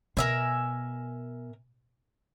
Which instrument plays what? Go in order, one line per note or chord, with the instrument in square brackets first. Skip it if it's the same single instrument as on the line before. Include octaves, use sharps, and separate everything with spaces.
[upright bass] B2 [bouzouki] A#4 E5 G#5